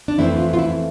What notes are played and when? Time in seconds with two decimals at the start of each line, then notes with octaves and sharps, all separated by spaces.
0.08 D4
0.18 F2 E3 A3 C4 E4
0.38 F4
0.53 F4
0.59 E4